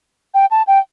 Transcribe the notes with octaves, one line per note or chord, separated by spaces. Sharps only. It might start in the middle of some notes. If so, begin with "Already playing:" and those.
G5
A5
G5